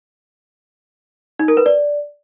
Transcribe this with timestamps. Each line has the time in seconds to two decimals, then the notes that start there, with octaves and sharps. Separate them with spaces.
1.39 D#4
1.48 A#4
1.57 B4
1.66 D5